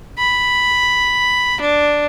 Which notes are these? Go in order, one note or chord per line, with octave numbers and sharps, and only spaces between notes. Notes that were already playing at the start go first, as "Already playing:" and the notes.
B5
D4